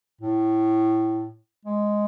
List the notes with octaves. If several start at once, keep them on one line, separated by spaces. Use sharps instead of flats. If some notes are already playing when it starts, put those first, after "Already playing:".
A2
G#3